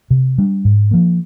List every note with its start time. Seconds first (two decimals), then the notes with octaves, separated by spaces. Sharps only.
0.10 C3
0.38 G3 D4
0.65 G#2
0.91 F3 A#3